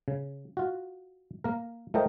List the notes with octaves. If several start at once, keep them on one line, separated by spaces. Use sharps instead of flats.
C#3
F4 F#4
A#3 A#4
A3 F4 A#4 C5 D#5 G5